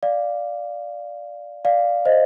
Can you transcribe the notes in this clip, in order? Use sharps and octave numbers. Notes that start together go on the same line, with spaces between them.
D5 F5
D5 F5
C5 D#5